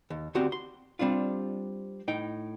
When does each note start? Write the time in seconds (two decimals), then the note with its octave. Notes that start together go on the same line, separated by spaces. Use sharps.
0.10 D#2
0.35 D2 C4 F#4 G4
0.52 C6
0.99 G3 C4 D4 F4
2.08 A2 D#4 G5